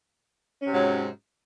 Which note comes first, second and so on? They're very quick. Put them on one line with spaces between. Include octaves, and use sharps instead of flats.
C#4 C3 F#3 G#2